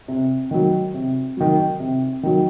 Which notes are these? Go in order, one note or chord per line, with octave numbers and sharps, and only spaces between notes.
C3
D#3 F#3
C3
D#3 F#3
C3
D#3 F#3